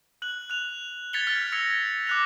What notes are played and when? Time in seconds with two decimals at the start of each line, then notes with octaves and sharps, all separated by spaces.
0.22 F#6 F#7
0.50 F#6 F7
1.13 G#6 A6 B6 C#7 F7 G7
1.27 F6 B6 G7
1.52 E6 G#6 A#6 C#7 F7
2.07 D6 F#6 F7